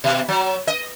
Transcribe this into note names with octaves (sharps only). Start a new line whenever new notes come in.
B2
F#3
D#5